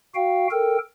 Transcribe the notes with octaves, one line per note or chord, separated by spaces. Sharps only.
F#4 F5 G5
A4 A#4 G5